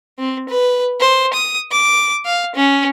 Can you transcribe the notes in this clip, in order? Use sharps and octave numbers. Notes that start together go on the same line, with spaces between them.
C4
B4
C5
D#6
D6
F5
C#4